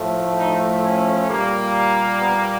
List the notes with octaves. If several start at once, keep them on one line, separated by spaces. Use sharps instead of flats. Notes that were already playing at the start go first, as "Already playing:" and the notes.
Already playing: A2 F3 A3
D#4
C#4
A#2 G3 A#3
B3